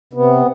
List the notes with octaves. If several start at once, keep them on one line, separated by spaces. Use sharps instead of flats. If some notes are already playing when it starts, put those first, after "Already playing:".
C3 B3